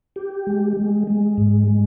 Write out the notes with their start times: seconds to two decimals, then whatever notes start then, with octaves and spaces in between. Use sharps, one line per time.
0.16 G4
0.47 G#3
0.77 G#3
1.07 G#3
1.38 G#2
1.68 G#3